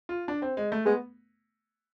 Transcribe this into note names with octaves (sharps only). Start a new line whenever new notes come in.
F4
D4
C4
G#3
A3
G#3 B3